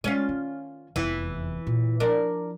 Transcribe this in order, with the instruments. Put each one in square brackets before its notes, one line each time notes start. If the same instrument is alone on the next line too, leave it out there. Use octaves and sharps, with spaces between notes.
[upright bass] G#3 [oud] C#4 F4
[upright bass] D#3
[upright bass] F1 E2 [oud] E3
[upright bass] A#2
[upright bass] F3 [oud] D4 A#4